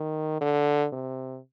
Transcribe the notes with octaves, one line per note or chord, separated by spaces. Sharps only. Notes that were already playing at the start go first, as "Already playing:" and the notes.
Already playing: D#3
D3
C3